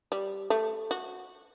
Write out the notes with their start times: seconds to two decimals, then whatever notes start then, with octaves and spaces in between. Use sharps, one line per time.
0.12 G3
0.50 A3
0.91 F#4